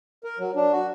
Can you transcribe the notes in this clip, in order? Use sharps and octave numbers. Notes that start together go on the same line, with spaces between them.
A#4
F#3
D4
F#4